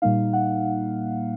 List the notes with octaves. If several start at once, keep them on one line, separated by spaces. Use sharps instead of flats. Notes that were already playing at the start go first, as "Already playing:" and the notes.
A#2 G3 A#3 D#4 F5
F#5